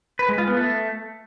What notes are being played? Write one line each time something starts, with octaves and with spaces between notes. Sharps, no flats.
B4
G#3
F4
B3
A3